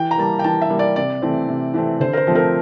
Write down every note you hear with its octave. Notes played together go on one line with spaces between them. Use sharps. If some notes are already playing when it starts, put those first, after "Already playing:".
Already playing: E3 G5
A#5
G3 A#3 A5
G5
E3 A5
E5
G3 A#3
D5
C3 D5
E3 A3 C4
C3
E3 A3 C4
D3 C5
A#4
C5
F3 A3 C4
A#4